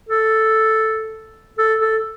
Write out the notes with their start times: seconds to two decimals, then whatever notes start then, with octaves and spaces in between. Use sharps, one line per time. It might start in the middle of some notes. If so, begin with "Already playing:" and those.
0.09 A4
1.59 A4
1.81 A4